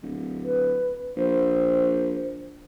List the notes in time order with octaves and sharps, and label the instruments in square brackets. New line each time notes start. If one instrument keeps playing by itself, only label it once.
[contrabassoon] D1
[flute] B4
[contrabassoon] A#1 [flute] C5